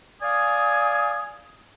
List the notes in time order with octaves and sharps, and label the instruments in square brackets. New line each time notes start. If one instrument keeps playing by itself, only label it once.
[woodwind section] D5 F5 G#5 D#6